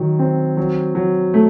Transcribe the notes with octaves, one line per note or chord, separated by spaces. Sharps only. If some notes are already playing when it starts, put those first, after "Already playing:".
Already playing: D#3 F#3
C4
F#3
F#3
A3